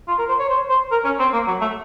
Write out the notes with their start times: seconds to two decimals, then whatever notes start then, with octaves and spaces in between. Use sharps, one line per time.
0.08 F4
0.18 A#4
0.29 C5
0.39 C#5
0.49 C5
0.70 C5
0.91 A#4
1.05 C#4
1.19 C4
1.33 A#3
1.47 F#3
1.61 A3